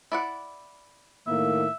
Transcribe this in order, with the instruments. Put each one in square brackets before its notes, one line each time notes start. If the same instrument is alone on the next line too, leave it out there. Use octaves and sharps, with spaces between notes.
[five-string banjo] E4 D5 F#5
[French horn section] A2 D#3 A#3 [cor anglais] E5